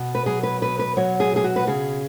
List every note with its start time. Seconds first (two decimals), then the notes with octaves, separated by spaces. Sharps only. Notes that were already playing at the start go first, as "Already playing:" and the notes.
Already playing: B2
0.15 B4
0.26 F#3 G#4
0.43 B4
0.62 B2 B4
0.79 B4
0.97 F#3 C#5
1.20 G#4
1.32 B2 G#4
1.44 F#4
1.56 B4
1.67 C#3 G#4